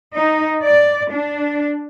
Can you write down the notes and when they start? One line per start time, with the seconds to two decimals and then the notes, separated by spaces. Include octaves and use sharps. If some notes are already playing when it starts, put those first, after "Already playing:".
0.14 D#4
0.63 D5
1.11 D4